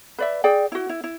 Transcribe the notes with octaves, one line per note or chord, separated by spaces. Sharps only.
B4 D5 E5
G#4 D5 G5
E4 F#4
E4
E4